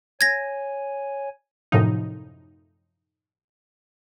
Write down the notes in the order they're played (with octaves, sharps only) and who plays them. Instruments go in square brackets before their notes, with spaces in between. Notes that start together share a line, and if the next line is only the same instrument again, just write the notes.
[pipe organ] C#5 G#5 [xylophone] G#6 A#6
[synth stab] F#2 A2 C3 F3 D#4